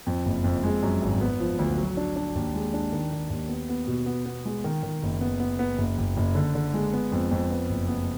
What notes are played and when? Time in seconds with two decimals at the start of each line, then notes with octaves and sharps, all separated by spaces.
0.07 F2
0.25 F#1
0.44 F2
0.64 G#3
0.83 F#2
1.02 G#1
1.21 B3
1.40 F3
1.59 D2
1.78 F#3
1.97 D4
2.16 D4
2.35 D#2
2.54 G#3
2.74 D4
2.92 D#3
3.12 D#3
3.30 D#2
3.49 B3
3.69 B3
3.87 B2
4.06 B3
4.26 B3
4.45 G#3
4.64 D#3
4.83 D#3
5.03 F#1
5.21 B3
5.40 B3
5.59 B3
5.78 F#1
5.98 F#1
6.17 F#1
6.35 D3
6.55 D3
6.74 G#3
6.93 B3
7.12 F2
7.31 F2
7.50 B3
7.69 F#1
7.88 B3